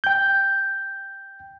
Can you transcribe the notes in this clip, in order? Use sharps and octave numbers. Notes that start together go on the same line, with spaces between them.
G5 G6